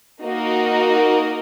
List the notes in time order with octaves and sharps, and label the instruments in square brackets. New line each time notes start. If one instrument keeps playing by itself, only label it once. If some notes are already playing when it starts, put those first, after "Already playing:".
[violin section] A#3 D#4 F#4 A#4 D#5